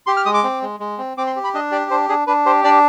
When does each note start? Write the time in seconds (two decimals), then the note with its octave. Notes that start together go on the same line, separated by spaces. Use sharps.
0.07 G4 C6
0.17 F6
0.26 G#3 D#6
0.34 D6
0.44 C4
0.62 G#3
0.80 G#3
0.98 C4
1.17 C4 D6
1.27 C6
1.36 G4
1.44 B5
1.54 D4 D#5
1.72 G4 D5
1.90 D4 C5
2.09 D4 G#4
2.27 D4 B4
2.46 G4 C5
2.64 D4 D5